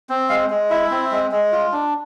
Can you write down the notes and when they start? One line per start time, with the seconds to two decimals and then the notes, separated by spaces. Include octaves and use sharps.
0.09 C4
0.29 G#3 F5
0.50 G#3
0.70 E4 E5
0.91 C4
1.11 G#3
1.32 G#3
1.52 F4
1.72 D4